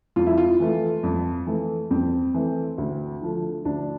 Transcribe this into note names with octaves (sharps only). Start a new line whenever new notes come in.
F2 F4
E4
F4
E3 A3
F2
E3 A3
F2 C4
E3 A3
D2
D3 F3 A3
D2 D4